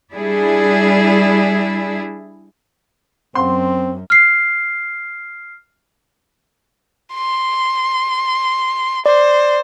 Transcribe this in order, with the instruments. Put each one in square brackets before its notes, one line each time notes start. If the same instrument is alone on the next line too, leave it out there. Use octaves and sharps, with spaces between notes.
[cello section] G3 D4 E4 G#4
[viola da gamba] F#2 [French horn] C4 [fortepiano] C6
[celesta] F6 C7
[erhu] C6
[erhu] C5 [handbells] D5